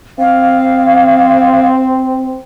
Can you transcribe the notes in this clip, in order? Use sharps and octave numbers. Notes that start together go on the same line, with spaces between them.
C4 F5